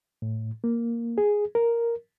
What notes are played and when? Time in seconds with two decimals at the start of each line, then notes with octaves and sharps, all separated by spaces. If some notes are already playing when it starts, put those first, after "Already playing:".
0.22 A2
0.64 A#3
1.18 G#4
1.55 A#4